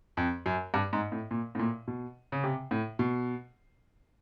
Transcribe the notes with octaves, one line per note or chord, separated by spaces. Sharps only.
F2
F#2
G2
G#2
A2
A#2
A2
A#2
B2
C#3
C3
A2
B2